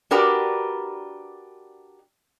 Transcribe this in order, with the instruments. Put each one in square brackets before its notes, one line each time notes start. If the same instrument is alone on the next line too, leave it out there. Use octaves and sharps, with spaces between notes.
[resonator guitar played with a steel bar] D4 F#4 G4 A#4 B4 D5